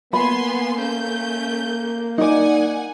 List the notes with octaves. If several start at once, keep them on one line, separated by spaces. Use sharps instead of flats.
A#3 B3 G#5 B5 C6
A3 C#4 G6
D#4 D5 F#5 G#5